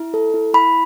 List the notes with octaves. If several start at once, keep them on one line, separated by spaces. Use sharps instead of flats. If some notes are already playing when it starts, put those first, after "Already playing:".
Already playing: E4
A4
E4
E4 B5